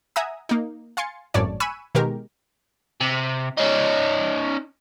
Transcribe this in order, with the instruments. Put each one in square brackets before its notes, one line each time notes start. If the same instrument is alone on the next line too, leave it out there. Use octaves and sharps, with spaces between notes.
[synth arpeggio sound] E5 F#5 G#5 A#5 D#6
A#3 D#4
F5 G#5 C6 A6 C#7
G#1 F#2 A2 C#5 D5 A5
G#5 B5 C#6 E6 F#6 D#7
B2 D#3 G#3 G4 A#4
[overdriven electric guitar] C3
C#4 D#4